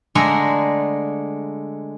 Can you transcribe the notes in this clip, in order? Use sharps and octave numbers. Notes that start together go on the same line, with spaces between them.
D3 G#3 A3 G#4 A#5